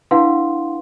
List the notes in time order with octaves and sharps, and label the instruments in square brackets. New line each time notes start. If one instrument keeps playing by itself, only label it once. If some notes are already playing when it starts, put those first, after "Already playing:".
[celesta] D4 E4 B4 F5 F#5 C6